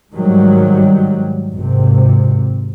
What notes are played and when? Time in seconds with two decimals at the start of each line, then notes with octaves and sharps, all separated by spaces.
0.13 G#2 D#3 F#3 G3
1.55 G#1 C3